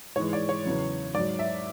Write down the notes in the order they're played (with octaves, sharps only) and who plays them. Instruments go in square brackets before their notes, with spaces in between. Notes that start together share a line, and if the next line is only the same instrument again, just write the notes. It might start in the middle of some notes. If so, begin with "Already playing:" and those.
[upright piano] G#2 E3 G#3 C#5
D5
C#5
E2 C#3 F#3
G#2 F#3 D5
E5